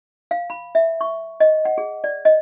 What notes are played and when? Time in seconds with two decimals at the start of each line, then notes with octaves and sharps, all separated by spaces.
0.31 F5
0.50 B5
0.75 E5
1.01 C#6
1.40 D#5
1.65 F#5
1.78 G#4
2.04 D5
2.25 D#5